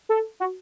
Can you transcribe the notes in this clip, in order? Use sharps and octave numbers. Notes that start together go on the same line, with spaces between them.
A4
F#4